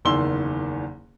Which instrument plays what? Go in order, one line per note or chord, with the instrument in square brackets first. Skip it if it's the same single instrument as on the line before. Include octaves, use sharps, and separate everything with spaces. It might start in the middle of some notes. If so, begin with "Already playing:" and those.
[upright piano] F#1 E2 D#3 C6 E6 G7